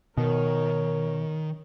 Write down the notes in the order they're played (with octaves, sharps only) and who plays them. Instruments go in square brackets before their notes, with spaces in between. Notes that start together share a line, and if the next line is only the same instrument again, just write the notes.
[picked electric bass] B2 [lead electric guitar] D#3 [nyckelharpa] A#4 C#5